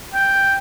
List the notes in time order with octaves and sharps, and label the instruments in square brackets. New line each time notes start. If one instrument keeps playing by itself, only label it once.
[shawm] G5